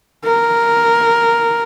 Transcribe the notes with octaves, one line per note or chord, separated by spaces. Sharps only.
A#4